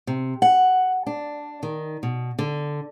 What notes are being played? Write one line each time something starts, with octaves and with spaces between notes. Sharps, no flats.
C3
F#5
D4
D#3
B2
D3